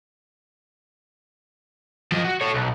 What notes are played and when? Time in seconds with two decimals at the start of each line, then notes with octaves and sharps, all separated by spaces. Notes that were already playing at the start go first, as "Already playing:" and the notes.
2.12 F3 D#5
2.24 F#4
2.41 A4 C#5
2.54 B1